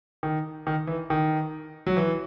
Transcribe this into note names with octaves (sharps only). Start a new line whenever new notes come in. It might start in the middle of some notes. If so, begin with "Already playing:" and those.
D#3
D#3
E3
D#3
F#3
E3